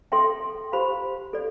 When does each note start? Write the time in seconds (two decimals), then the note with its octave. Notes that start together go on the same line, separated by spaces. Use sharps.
0.12 A4 E5 G5 C6
0.72 G4 C5 F5 B5
1.33 A4 D5